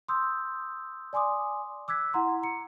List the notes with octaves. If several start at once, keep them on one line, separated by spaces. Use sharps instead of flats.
C6 D#6 E6 G6
D5 G#5 C6 D6 D#6
D6 E6 F#6 G#6 B6
E4 F#5 A#5 C6
A#5 C#7